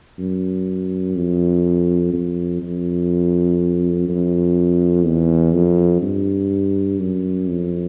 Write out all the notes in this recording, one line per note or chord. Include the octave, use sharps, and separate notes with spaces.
F#2
F2
F2
F2
F2
E2
F2
G2
F#2
F2